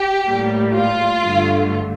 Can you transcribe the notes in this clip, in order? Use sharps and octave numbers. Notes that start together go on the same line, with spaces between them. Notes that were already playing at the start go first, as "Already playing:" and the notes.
Already playing: G4
A2 G3 A#3
F4
G2 D3 A3